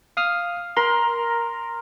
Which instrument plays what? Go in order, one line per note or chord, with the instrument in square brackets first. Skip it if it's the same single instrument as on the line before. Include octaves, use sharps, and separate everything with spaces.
[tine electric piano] F5 D#6 F6
[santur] A#4 [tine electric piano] C6